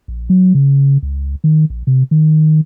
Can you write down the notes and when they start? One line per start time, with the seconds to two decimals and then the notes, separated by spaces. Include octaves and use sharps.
0.08 A#1
0.29 F#3
0.55 C#3
1.03 C#2
1.44 D#3
1.70 A#1
1.87 C3
2.11 D#3